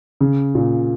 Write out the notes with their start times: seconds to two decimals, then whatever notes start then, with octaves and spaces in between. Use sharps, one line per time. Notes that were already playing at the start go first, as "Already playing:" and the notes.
0.21 C#3
0.55 A#2